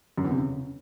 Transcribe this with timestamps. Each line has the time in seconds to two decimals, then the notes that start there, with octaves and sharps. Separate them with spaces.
0.18 F#2
0.24 E2
0.31 C3
0.38 C#3